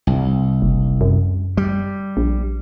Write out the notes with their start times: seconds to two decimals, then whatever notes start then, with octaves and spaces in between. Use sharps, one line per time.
0.07 C2
0.62 F#1
1.01 F#2
1.57 G3
2.17 A#1